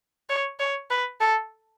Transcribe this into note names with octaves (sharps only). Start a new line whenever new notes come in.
C#5
C#5
B4
A4